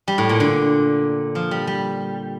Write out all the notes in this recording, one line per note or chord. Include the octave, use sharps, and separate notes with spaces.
G3
A2
A#2
D3
F3
G3
G3